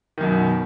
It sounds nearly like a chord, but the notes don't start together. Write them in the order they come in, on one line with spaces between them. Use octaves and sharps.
D#3 F#2 B2